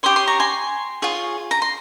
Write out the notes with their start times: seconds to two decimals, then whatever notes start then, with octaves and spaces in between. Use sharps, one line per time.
0.03 G4 C#5 C6 D#6
0.16 C6 D#6
0.27 A#5 C#6
0.40 G#5 C6
1.02 F4 G#4 C#5
1.51 A#5
1.62 C6